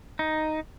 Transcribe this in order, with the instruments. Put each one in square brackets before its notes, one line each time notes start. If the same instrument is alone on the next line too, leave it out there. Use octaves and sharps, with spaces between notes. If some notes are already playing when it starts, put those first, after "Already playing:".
[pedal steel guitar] D#4